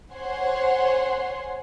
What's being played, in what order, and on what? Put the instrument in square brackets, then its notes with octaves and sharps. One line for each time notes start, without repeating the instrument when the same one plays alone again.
[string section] C5 C#5 F#5 G#5 C6